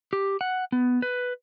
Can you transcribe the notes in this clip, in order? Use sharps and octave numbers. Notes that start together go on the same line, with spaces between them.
G4
F#5
B3
B4